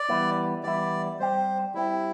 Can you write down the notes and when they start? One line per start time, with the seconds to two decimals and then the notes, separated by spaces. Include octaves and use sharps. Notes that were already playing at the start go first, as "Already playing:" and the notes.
Already playing: D5
0.09 E3 G3 B3 E4
0.63 E3 G3 B3 E4 D5
1.19 G3 C4 G4 C5
1.74 G3 C4 E4 G4